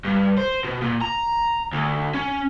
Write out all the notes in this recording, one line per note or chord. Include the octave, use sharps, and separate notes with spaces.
G2
C5
B2
A#2
A#5
D2
C#4